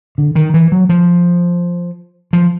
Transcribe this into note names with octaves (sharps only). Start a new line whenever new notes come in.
D3
D#3
E3
F#3
F3
F3